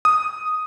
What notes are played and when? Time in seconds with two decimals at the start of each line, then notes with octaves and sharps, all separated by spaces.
0.05 D#6